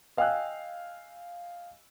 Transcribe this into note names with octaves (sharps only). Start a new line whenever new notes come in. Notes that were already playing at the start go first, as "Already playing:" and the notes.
D#5 F5 G5 G#5 E6 F#6